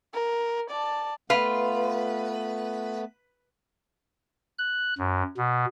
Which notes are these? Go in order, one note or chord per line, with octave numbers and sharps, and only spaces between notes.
A#4
D5 A5
A3 B3 F4 B4
F#6
F#2
B2